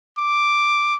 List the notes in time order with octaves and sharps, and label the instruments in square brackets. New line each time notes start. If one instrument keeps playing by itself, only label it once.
[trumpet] D6